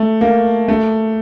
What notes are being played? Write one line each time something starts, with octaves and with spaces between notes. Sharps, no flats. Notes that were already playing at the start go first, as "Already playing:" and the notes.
Already playing: A3
A#3
A3